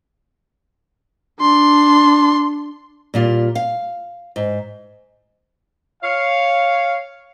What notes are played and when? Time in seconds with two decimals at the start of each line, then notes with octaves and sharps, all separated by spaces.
1.40 D4 C6
3.14 A#2 G3 F4
3.55 F5
4.36 G#2
6.02 C#5 F5